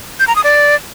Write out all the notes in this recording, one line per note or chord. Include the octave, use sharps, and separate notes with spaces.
G6
A#5
D#6
D5